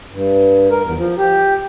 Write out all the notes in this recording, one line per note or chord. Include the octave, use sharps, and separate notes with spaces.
G2
A#4
E2
F3
G4